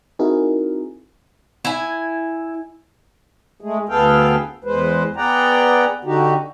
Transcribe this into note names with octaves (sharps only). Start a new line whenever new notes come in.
C4 D#4 E4 F#4 G#4 A#4
E4 G#5
G#3 A3 G#4
D2 B3 G#4 A4 F5 G5
E2 G#3 B4 C5
B3 G#4 D5 F#5 G5 A#5
D3 D#4 F#4 G4